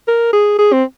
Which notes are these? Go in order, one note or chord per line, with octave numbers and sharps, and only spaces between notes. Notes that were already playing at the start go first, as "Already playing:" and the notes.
A#4
G#4
G#4
C4